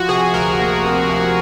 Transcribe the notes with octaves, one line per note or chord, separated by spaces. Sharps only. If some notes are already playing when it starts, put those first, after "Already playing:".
Already playing: F3 F#4
C3 G#4
D2 A#4
A#3
C3
A#3